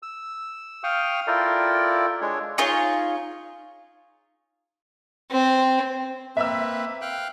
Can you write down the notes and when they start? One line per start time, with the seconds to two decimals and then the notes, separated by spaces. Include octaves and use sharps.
0.03 E6
0.84 F5 G5 C#6 D#6 F6
1.27 E4 F4 A4 A#4 D5 G5
2.21 G#3 D4 C#5
2.58 D#4 F4 G#4 C#5
5.32 C4
6.37 A#3 C4 B4 E5 E6
7.01 F5 G5 F#6